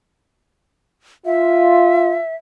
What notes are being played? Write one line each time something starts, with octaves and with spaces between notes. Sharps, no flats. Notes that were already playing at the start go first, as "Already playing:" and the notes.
F4 E5